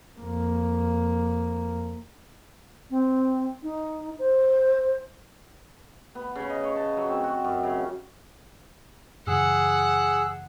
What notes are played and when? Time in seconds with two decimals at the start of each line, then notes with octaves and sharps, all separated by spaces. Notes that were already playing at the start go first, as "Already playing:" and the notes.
0.18 F2 A#3
2.90 C4
3.63 D#4
4.19 C5
6.15 B3
6.36 C#3
6.50 D#5
6.64 C#5
6.76 A5
6.97 F#3
7.09 C4
7.24 F#4
7.44 F#2
7.63 C#3
9.27 F#2 C#3 E3 G#4 F#5 E6